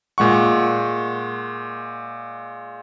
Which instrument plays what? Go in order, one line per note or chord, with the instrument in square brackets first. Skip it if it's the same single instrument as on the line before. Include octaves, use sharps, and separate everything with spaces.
[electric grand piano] A#2 G#3 F#5 C#6